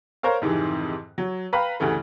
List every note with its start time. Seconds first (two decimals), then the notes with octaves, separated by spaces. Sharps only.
0.23 A#4 C5 C#5 F5
0.42 F2 G#2 C3 D#3 E3
1.18 F#3
1.53 B4 F5 G5 A#5 B5
1.80 D2 G2 C#3 E3 A3